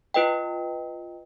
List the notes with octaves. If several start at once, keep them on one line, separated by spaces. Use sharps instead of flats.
F4 B4 D#5 G5